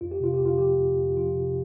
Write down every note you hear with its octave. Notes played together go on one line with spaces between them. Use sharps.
F2 F4
G4
C3 F4
G4
F2
F4
F3 G4
F2
F2
F3 F4
C3